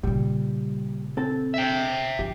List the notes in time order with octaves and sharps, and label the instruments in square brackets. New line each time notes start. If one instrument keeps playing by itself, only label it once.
[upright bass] A#2 C#3 [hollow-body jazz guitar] G3
[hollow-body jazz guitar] C4 A4
[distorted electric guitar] E5 G5
[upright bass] F#2 F3 [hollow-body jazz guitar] G4